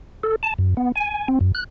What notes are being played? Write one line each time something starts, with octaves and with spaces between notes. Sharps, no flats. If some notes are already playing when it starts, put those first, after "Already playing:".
A4
A5
F#2
B3
G#5
C4
F#2
F#6